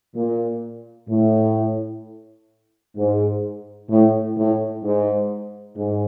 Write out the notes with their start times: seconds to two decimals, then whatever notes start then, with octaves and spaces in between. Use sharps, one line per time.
0.16 A#2
1.09 A2
2.97 G#2
3.90 A2
4.38 A2
4.83 G#2
5.77 G#2